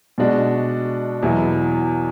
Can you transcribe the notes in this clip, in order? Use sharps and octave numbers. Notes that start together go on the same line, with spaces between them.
B2 G#3 D4 F#4
E2 B2 F#3 B3 E4